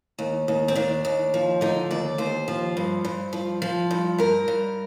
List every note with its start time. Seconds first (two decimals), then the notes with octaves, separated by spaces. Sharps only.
0.19 D#2
0.48 D#2
0.68 C4
0.75 D#2 D4
1.05 D#2
1.34 F3
1.61 D3 D#4
1.91 D#2 D5
2.18 D#2 C5
2.48 F3
2.77 G2
3.05 G2
3.33 F3
3.62 F3
3.91 G2
4.18 G2 A#4
4.48 G2